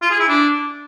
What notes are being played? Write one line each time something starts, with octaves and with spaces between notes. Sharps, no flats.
F4
G#4
E4
D4